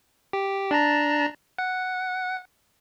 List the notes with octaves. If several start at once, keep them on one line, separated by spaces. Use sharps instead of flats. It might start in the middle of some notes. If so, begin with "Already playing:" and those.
G4
D4 A5 A#5
F#5